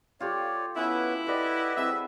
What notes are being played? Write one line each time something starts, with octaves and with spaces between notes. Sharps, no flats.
F4 G4 A4 C#5 D5
B3 C#4 E4 B4
G4 A4 B4 D5 D#5 F#5
C4 E4 G#4 E5